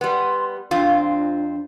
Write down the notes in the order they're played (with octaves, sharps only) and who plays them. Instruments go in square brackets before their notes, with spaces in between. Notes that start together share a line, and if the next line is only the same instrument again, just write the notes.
[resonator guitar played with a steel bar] G3 B3 [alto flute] C6
[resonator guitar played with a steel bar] F2 C4 F4 [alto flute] D4